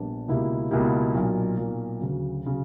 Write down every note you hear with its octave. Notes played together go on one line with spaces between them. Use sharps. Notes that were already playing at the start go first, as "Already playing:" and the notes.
Already playing: A#1 A#2 G3 B3 D4
C#2 B2 A#3 E4 G4
C#2 B2 A#3 E4 G4
B1 A#2 A#3
B1 A#2 A#3
D2 C#3 F#3
C#3 F#3